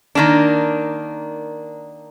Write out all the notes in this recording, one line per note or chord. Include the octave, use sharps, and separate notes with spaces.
D#3 A#3 D4